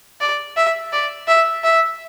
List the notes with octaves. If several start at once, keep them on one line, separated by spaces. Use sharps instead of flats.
D5
E5
D5
E5
E5